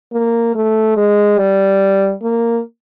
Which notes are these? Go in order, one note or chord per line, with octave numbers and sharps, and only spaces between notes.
A#3
A3
G#3
G3
A#3